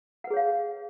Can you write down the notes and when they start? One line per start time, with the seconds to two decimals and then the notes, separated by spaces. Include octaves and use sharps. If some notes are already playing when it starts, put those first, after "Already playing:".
0.24 F#5
0.27 B4
0.30 G#4
0.33 C#5
0.37 F5